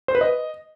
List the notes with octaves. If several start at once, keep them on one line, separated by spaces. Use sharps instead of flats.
C5
B4
D#5